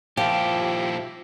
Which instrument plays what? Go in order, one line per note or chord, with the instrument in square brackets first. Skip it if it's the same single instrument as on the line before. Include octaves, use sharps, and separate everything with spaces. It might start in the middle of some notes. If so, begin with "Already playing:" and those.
[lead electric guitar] A#2 E4 [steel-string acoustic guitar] F3 [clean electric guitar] G4